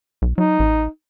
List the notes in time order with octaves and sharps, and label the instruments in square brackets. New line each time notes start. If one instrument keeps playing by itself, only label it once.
[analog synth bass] B1
[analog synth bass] F#3 [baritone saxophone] D#4
[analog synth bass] A1